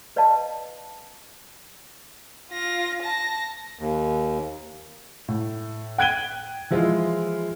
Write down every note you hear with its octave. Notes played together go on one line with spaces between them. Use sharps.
B4 D5 D#5 F5 A5
F4 A#6
A5 A#6
D#2
A2
G5 F#6 G#6 D7 D#7 G7
E3 F3 G#3 E4 F4